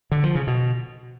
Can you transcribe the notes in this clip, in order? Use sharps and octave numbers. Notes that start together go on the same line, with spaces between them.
D3
F3
C#3
B2